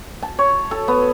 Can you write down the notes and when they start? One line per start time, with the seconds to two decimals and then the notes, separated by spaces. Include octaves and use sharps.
0.22 A5
0.39 C#5
0.71 A4
0.88 B3